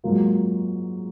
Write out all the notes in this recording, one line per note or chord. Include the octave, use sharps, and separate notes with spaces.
G#2 F#3 A#3 F4